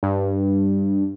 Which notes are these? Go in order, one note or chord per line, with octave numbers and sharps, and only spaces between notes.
G2